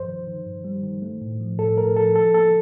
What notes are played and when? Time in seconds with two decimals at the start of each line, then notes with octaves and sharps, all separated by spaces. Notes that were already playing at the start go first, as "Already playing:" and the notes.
Already playing: G2 F3 C5
0.08 D#3
0.27 D#3
0.46 G2
0.64 G3
0.83 D#3
1.02 A3
1.21 A2
1.40 F3
1.59 A2 A4
1.78 A3 A#4
1.96 F3 A4
2.15 F3 A4
2.34 A#3 A4